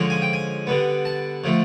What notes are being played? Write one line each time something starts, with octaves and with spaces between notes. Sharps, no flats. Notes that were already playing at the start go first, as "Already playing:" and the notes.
Already playing: D3 F3 G#3 C#4
G#5
G5
G#5
D3 G3 B3
A5
D3 F3 A3